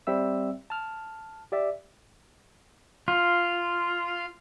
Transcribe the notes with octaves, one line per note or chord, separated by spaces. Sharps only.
G3 C4 E5 E6
A5 F6
G4 D5 E5
F4